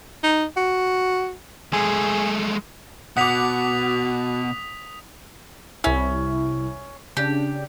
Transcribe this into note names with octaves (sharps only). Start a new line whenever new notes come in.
D#4
F#4
G#3 A3 G#4
B2 F#4 F#5 D6 D#6 B6 F7
C2 C#4 E4
C#3 D4 G4